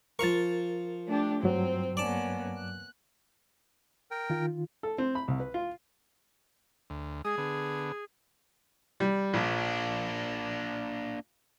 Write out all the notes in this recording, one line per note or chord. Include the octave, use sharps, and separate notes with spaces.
F3 A#4 F5 C#6 A6
A3 D4 G4
G2 F#3 C4
A#3 B3 C#4 D5 A5
F#6
A#4 G5
D#3 F4
A4
C4
B5
C2
B4
F4
D2
G#3 G#4 D#6
D3 B3
G3
A#1 A#3 D4